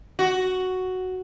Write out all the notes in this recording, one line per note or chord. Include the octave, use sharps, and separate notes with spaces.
F#4